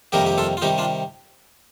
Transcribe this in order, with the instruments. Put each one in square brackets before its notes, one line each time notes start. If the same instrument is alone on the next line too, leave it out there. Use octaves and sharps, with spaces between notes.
[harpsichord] F2 C3 D#3 G3 A#3 G4 A#4
G4
F4 A4
F4
C3 D#3 G3 D#4 G4
D4 F4